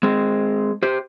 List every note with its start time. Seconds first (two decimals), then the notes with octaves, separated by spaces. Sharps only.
0.03 G#3 C4
0.83 G4 C5